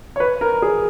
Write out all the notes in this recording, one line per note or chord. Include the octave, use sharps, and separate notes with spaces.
C#5
B4
A#4
G#4